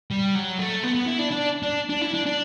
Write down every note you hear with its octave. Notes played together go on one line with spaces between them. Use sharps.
G3
F#3
A3
B3
B3
E4
D4
D4
D4
D4
E4
D4
D4